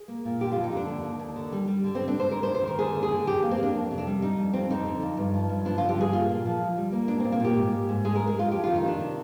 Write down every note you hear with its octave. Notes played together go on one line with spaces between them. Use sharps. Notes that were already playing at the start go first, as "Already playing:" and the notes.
Already playing: G#4
A#3
A#2
D3 G4
F2 F4
D#4
D3 D4
D#2
D#2
D#2
D3
G3
G3
D3
D3 C4
D4
D3 C5
D2 A#4
C5
C3
C5
D#3 A#4
D3 G#4
D#2
G#4
D3
F2 G4
A#3
C4
A#3 D4
F2
C3
D4
G3
G3 D#4
F2
F2 C4
D3 D#4
D3
F2
G2
F3
G2
F3 D4
D3 F4
G4
G2 G#4
A#3 F4
A#2
F3
D2
G3
A#3
G#3 D4
A#2 C4
A#3
A#2 G4
G#2
A#3
G#2
G#3 G#4
G#3 A#4
G#4
G#3 F4
F2 G4
D#3 F4
D#4
D#3 D4
C3